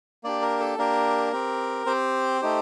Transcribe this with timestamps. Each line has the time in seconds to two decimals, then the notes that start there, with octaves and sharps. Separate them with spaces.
0.24 A#3 D4 G4 D5
0.42 A#4
0.60 A4
0.78 A#3 D4 G4 A#4
1.33 C4 G4
1.86 C4 G4 C5
2.42 A3 D#4 G4